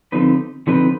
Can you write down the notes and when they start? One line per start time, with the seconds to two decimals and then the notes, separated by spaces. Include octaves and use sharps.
0.12 D3 F3 C4 D#4 B4
0.67 D3 F3 C4 D#4 B4